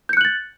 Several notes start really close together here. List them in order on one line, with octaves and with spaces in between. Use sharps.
G6 C#7 F#6 F#7 A6